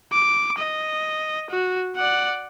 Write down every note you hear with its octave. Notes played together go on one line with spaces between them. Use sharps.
D6
D#5
F#4
D5 F#5